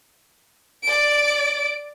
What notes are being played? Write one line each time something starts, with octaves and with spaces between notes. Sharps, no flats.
D5 D7